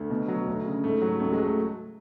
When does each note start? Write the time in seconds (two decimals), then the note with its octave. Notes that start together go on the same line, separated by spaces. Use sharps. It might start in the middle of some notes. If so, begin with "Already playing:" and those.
Already playing: D2
0.10 B2
0.28 F#3
0.47 D2
0.65 C#3
0.84 G#2 A3
1.02 F#3
1.20 C#2 A3
1.32 G#3
1.38 F#3
1.44 A3